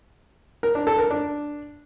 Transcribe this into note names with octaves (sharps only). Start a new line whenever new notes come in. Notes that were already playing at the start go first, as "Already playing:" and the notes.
A#4
D4
A4
A#4
D4